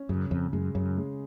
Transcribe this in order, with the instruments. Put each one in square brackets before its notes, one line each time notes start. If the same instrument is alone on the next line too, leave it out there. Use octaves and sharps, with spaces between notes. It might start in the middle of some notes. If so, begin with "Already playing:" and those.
Already playing: [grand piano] C#4
[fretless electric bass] F#2 [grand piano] C#3
[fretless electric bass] F2 [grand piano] C#3
[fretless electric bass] F#2 [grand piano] G#3
[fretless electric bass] F#2 [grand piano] C#3
[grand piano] G#3